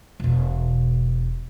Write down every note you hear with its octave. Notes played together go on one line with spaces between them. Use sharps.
E1 B2